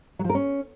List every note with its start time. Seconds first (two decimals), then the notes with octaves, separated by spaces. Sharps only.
0.19 F#3
0.24 F3
0.30 A#4
0.35 C#4